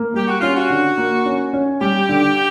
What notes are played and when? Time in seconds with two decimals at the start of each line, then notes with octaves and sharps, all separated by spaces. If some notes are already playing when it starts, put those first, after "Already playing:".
Already playing: A#3
0.14 G3 G4
0.27 F#4
0.41 C#4 F4
0.55 F#4
0.70 D3
0.98 A#3
1.26 C#4
1.53 C#4
1.81 G3 G4
2.09 D3